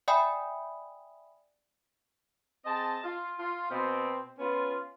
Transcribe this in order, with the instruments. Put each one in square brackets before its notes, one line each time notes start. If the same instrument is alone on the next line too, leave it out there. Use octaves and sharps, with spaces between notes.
[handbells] D5 E5 G5 G#5 B5 D#6
[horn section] C4 G#4 D#5 A5
F4
F4
B2 C4
B3 C#4 F4